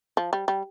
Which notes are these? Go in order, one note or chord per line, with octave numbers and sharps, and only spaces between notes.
F3
G3
G3